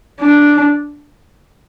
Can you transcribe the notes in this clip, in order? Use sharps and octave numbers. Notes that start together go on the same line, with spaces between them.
D4